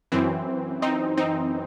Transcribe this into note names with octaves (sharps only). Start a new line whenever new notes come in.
F#2 E3 C4
C4 D#4
C4 D#4